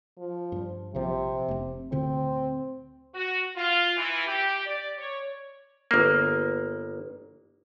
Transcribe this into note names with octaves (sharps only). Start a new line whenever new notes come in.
F3
G2 G3
A#1 C3 F3
F1 C4
D2 A#2 D3 C4
F#4
F4
E3
G4
D5
C#5
G1 A#3